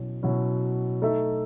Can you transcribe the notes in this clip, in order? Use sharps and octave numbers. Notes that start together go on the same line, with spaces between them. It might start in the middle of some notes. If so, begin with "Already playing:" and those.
Already playing: B2 F#3 C#4 E4
B2 F#3 C#4 E4
A3 D#4 A4 E5